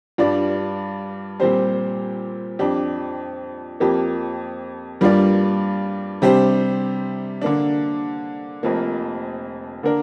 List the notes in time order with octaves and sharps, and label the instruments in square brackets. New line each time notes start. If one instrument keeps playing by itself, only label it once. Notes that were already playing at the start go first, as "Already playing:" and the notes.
[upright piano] G2 G3 D4 F4 D5
A#2 G3 C4 G4 C5
F2 F3 D4 G4
F2 F3 A#3 G4
G2 G3 A#3 F4 D5
C3 G3 D4 G4 C5
D3 A#3 D4
F1 F2 F3 A#3
D3 A#3 D4 A#4